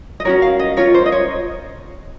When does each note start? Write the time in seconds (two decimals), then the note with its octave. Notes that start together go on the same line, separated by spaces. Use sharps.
0.20 D#5
0.25 C#4 F#4 A#4 C#5
0.42 F5
0.59 D#5
0.77 C#4 F4 A#4 C#5
0.94 C5
1.06 D#5
1.12 C#5